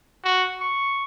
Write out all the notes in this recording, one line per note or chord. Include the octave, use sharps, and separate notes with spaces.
F#4
C#6